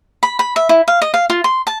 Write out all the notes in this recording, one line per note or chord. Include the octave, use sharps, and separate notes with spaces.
B5
B5
E5
E4
F5
D#5
F5
F4
C6
A5